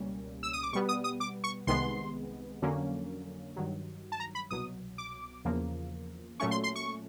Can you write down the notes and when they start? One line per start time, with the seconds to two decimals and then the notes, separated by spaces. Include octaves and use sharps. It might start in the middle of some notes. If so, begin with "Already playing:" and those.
Already playing: C#2 B2 G3 A#3 C#4
0.43 E6
0.53 D#6
0.63 D6
0.73 B2 G3 B3 C#6
0.89 D#6
1.04 D#6
1.20 D6
1.44 C#6
1.67 C2 C3 D#3 G#3 B3 C6
2.62 F2 D3 F#3 A#3 C#4
3.56 G2 D#3 F#3
4.12 A5
4.20 A#5
4.35 B5
4.50 C2 B2 F#3 D#6
4.98 D6
5.45 E2 C#3 F3 A#3
6.40 A#2 F#3 A3 C#4 C#6
6.51 C6
6.64 C6
6.76 C#6